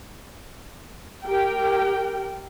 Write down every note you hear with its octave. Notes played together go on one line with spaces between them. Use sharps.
G4 A#4 G5